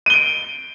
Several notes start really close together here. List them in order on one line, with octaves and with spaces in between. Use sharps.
D#7 G7 D7